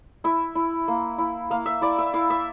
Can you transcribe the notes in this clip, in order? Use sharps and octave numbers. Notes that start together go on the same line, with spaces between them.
E4 E5
E4
A#3
E4
A#3 F5
E5
E4 D5
E5
E4 F5
E5